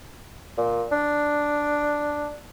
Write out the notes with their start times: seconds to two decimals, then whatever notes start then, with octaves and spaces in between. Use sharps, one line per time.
0.58 A#2
0.92 D4